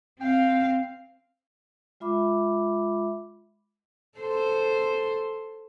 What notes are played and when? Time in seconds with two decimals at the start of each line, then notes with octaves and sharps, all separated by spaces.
0.20 C4 F5 G5
2.00 G#3 F4 E5 B5 D6
4.18 A4 C5